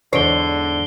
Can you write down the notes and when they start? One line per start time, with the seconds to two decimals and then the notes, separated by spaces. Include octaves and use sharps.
0.13 E2 G#2 D3 C#5 C7 D7 G7